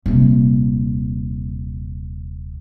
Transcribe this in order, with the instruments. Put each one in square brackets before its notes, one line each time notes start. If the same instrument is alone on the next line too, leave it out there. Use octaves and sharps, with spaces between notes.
[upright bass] D#1 C3